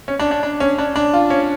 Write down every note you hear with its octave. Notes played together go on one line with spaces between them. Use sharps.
C#4
D4
D4
D4
C#4
D4
D4
F4
C#4